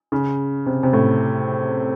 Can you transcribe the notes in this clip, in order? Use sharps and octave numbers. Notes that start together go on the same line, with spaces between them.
C#3
C3
C3
A2